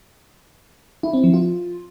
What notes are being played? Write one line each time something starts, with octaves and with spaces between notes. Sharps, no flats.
E4
C4
F3
F4